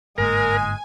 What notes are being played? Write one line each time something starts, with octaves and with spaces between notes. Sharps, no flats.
G1 G#2 G#3 A#3 A#4 G#5